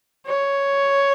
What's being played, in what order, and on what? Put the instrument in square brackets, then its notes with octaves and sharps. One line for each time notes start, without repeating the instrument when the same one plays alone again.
[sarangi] C#5